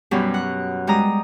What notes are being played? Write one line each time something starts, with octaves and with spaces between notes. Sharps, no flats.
F#2 B2 F#3 G3
F#5
G3 G#3 A#5 D#6